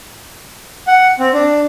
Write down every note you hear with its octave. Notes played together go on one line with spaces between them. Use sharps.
F#5
C4
D4